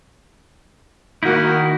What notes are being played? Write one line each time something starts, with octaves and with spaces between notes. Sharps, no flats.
D#3 A#3 D#4 E4 F#4